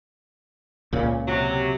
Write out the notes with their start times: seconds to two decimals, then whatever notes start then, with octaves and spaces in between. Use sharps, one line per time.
0.93 C#2 A#2 C#3
1.28 C3 F#3